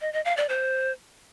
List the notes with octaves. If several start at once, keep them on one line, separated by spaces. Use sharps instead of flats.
D#5
D#5
F5
D5
C5